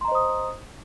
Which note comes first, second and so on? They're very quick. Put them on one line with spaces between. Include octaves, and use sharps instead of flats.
C6 A#5 D#5 C5 D#6